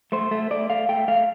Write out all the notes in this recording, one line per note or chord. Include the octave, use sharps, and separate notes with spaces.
A3 C5
A3
A3 D5
A3 F5
A3 G5
A3 F5